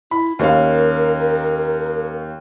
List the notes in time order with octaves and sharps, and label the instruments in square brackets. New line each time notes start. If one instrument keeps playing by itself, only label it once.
[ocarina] E4 [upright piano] B5
[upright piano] D#2 C#4 F5 [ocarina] A#4